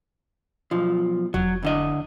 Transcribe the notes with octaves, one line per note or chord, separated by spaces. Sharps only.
B1 F3
F1 F#3
D2 D3 D#5